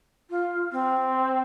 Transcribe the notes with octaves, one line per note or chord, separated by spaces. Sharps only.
F4
C4